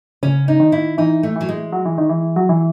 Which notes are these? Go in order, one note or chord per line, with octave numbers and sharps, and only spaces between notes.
C#3 C#4
D#4
D#3
E4
E3 D#4
A3
E3 F#3
G#3
F#3
E3
D#3
E3
F#3
E3